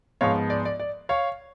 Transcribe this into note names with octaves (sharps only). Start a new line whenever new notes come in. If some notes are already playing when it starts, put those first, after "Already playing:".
G#2 F3 B3 C#5 F5
D5
D5
D5
C#5 F5